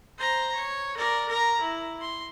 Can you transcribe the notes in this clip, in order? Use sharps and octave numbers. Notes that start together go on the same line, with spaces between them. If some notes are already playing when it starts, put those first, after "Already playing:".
C5 A#5
C#5
A#4 D5
A#4 A#5
E4
C6